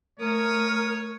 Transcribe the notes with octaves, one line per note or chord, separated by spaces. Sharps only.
A3 A#4 C#5 D#6